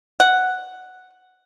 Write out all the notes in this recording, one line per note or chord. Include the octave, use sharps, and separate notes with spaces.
F#5